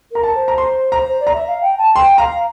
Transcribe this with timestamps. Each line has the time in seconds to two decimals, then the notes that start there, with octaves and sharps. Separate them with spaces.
0.11 A#4 A#5
0.23 A5
0.34 C5
0.48 A#5
0.58 C6
0.92 A#5
1.07 C5
1.20 D5
1.27 A#5
1.33 E5
1.47 F5
1.61 G5
1.77 A5
1.95 G5 C6
2.18 F5 A#5